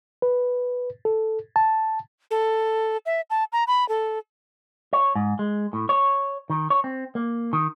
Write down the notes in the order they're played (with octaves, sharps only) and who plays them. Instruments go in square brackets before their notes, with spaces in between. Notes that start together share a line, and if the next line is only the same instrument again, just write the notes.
[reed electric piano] B4
A4
A5
[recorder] A4
E5
A5
A#5
B5
A4
[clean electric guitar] C#5
G#2
G#3
A2
C#5
D#3
C#5
C4
A#3
D#3